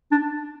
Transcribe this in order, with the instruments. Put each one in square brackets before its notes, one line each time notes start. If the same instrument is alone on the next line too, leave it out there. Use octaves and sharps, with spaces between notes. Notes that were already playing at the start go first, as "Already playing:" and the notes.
[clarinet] D4